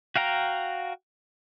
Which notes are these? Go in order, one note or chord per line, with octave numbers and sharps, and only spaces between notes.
F#4 F5 G5 A#5